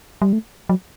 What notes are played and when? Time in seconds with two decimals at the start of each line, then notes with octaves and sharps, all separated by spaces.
0.22 G3
0.33 A3
0.69 F#3